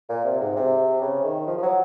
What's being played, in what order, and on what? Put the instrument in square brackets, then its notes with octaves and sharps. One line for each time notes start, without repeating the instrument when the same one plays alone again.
[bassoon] A#2
C3
G#2
C3
C#3
D#3
F3
F3
F#3